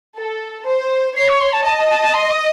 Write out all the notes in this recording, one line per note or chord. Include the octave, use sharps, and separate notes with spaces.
A4
C5
C#5 C7
C#6
C6
A5
D#5 A5
A5
A5
A5
C6
D#6